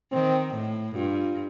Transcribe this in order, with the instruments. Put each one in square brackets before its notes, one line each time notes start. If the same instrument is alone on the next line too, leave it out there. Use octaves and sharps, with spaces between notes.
[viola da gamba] D#3 [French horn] C4
[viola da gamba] A2
[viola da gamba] G2 [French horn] F4